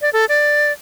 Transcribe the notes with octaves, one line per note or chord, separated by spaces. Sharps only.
D5
A4
D5